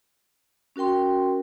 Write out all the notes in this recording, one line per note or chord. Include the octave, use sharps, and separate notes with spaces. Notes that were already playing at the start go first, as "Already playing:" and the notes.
C#4 F#4 A#4 G5 C6